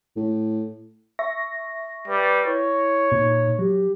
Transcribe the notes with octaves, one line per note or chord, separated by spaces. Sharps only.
A2
E5 C#6 A#6
G3 B4
E4 C#5
A#2 D#4
F#3 G4